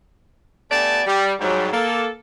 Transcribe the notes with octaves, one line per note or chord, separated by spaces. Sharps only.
A3 B3 G4 D5 G#5 A5
G3
G#2 F#3 G3
A#3 A4